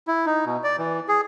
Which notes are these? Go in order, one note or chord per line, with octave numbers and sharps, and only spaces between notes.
E4
D#4
B2
D5
E3
G#4